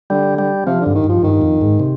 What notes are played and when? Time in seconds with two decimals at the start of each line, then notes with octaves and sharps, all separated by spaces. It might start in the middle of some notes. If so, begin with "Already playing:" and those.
0.10 D3 G3
0.39 G3
0.66 C3 F3
0.81 D3
0.86 G2
0.95 D#3
1.04 G2 F3
1.23 G2 D#3
1.41 F2
1.61 G#2
1.80 C3